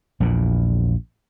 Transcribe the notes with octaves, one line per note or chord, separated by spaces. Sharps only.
A#1 E2 A#2